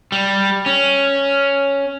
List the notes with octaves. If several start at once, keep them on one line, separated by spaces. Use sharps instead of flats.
G3
C#4